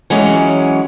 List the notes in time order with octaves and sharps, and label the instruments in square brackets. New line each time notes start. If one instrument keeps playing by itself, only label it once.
[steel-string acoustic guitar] E3 F#3 G#3 C#4